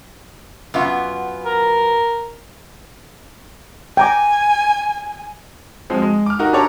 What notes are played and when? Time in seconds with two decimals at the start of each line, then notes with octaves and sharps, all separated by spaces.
0.74 F#2 B3 F4
1.45 A#4
3.97 G5 G#5 A#5 D6
5.90 F3 F#3 G#3 C4
6.02 G#3
6.26 D6 F6
6.39 D#4 F#4 G4 A#4
6.53 D4 G4 A4 C#5 A#5 D6